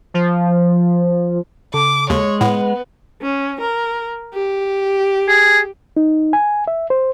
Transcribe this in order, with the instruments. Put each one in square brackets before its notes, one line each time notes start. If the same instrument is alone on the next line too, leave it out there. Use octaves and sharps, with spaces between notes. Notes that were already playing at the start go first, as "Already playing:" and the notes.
[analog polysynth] F3
[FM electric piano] C#3 A4 [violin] D6
[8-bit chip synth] D#2 [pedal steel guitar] G#3 [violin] C#5
[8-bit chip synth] A2 [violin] B3 [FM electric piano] B4 F#5
[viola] C#4
A#4
G4
[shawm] G#4
[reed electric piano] D#4
G#5
E5
C5